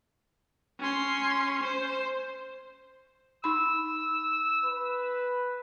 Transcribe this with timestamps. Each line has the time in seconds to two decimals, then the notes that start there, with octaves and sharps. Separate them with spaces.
0.80 C#4 C6
1.63 C5
3.44 D#4 B5 E6
4.64 B4